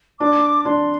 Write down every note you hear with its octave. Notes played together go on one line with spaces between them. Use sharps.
D4 D6
D4 C6